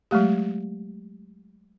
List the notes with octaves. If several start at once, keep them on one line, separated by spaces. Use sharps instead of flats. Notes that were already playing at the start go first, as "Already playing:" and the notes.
F#3 G#3 A3 G4